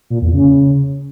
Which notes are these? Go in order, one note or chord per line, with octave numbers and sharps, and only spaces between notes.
A#2
E2
C#3